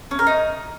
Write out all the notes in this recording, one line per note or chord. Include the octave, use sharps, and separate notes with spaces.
C#4
A#4
D#4